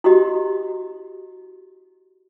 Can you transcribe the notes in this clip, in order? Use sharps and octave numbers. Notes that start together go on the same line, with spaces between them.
E4 F#4 G4 D#5